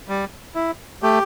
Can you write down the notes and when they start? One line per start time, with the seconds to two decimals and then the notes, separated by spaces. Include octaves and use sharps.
0.08 G3
0.55 E4
1.02 A3 G4